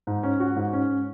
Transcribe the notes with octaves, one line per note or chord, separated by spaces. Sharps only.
G#2
C#4
F#4
G#2
C#4